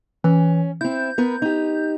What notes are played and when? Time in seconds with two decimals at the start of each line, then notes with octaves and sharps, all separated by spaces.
0.24 E3 C#4
0.81 C4 E4 G6
1.18 B3 A#4 B4
1.42 D#4 G4